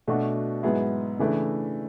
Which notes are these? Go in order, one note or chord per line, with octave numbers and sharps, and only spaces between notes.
B2 A3 D4 F#4
G#2 F#3 B3 E4 G#4
C#3 E3 A3 D4